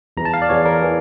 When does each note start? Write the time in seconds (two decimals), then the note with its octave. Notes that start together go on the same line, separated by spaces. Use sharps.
0.17 E2 E3 A#5
0.25 A5
0.34 F5
0.42 D5
0.49 E2 E3 C#5
0.65 A#4
0.82 E3